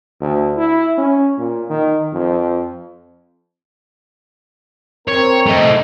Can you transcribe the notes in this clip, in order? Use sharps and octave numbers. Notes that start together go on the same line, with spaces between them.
D2
E4
C#4
A#2
D#3
F2
C4 A#4 C#5
A3 D#4